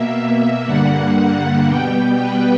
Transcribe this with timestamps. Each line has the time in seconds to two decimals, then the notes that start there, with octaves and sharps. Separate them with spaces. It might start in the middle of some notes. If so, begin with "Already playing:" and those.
Already playing: B2 A#3 E5
0.15 E5
0.65 G2 D3 G3 A#3 F#5
1.67 B2 G3 B3 G5
2.19 B4